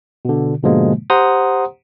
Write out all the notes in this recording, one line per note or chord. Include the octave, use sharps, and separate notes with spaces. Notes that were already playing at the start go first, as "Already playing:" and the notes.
B2 D3
G#2 B2 D3 F3 G#3 A#3
G4 C5 F#5 A#5 C6 D#6